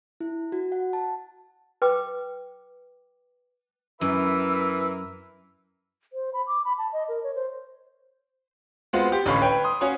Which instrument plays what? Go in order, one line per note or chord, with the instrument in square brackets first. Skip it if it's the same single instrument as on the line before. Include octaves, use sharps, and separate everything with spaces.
[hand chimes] E4
F#4
F#5
A5
[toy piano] B4 G5 D6
[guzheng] F#2 [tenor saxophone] E3 [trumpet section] A#4 E5 B5 [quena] E6
[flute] C5
B5
D6
B5
A5
D#5
A#4
C#5
C5
[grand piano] G#3 B3 C4 F4 F#4
G4
A1 D3 C#4 F5 B5 C#6
B4 C#5 G5
C6 D#6
C#4 F#4 C#5 F5 G#5